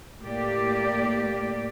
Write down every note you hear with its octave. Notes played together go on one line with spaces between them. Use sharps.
A2 A#3 G4 D5